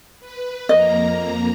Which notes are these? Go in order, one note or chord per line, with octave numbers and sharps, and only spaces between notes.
B4
F2 A#3 D#5 A#5